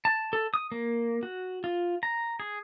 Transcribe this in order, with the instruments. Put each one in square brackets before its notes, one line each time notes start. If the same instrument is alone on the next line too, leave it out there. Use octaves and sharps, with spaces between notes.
[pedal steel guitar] A5
A4
D#6
A#3
F#4
F4
A#5
G#4